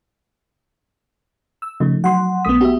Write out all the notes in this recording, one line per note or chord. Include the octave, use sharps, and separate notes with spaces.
E6
C#3 F3 A3 D#4
F#3 F#5 C6
A#1 A3 B3 D#6 B6
B3 F#4 G4 E5